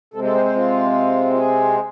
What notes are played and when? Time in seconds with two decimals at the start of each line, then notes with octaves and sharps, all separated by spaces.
0.14 C3 G#3 C4 A4
0.24 A4
0.34 C5
0.45 C5
0.55 F4
1.33 F4
1.38 G#4